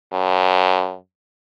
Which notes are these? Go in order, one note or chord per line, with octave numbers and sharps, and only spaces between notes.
F#2